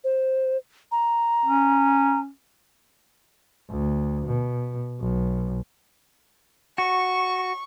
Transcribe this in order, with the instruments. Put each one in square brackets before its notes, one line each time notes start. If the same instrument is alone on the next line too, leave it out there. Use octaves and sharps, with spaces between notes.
[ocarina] C5
A#5
[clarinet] C#4
[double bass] D2
B2
B1
[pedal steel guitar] F#4 [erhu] C#6